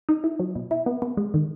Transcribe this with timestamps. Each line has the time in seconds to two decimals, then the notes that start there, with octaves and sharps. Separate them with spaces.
0.09 D#4
0.24 E4
0.39 F#3
0.55 B2
0.71 E4
0.86 B3
1.02 B3
1.17 G#3
1.34 D#3